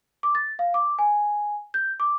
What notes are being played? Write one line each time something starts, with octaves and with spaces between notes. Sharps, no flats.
D6
A6
F5
D6
G#5
G6
D6